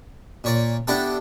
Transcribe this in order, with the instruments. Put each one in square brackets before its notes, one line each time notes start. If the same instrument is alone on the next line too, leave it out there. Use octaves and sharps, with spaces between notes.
[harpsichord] A#2 C#5 D5
B3 D4 E4 G4 A4